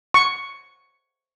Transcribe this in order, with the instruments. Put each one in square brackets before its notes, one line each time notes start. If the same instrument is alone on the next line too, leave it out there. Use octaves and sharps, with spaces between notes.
[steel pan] C#6